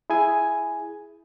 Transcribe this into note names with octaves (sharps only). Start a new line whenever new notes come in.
E4 G#4 G#5